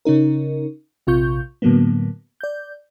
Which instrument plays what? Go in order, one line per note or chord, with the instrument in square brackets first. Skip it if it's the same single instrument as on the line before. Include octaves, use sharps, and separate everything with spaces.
[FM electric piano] C#3 C#4 D#4 A#4
A#1 C3 F4 C#6 G6
A2 D3 F#3 A#3 B3
D5 G6